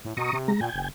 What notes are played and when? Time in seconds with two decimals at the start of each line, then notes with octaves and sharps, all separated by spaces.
0.05 A2
0.17 B2 A#5 C#6 D#6
0.33 C3
0.48 G#3 A#5
0.60 A#2 G5 G#5
0.74 F#1